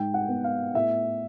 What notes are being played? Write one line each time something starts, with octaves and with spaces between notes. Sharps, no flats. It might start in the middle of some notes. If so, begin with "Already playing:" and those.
Already playing: G#2 G5
F#5
B3
F5
A2 E5